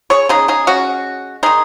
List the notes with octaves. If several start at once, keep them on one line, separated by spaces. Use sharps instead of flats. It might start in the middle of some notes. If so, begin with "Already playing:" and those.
G#4 C#5
C#3 G#3 D#4 G#4
D#4 G#4
C#4 F#4
D#3 G#3 D#4 G#4